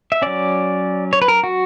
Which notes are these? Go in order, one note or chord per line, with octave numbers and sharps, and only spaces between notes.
E5
F#3 C#4 D5
C#5
B4
A#4
F#4